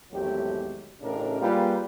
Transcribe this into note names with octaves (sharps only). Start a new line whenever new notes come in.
G#1 E2 F#3 A3 G4
A1 A2 C#3 D4 D#4 A#4
G3 A#3 F4 G#4 B4